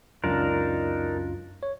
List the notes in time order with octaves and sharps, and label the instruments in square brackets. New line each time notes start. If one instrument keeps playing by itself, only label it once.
[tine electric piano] C#2 F#2 F4 [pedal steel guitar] D4 D#4 A#4
[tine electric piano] C#5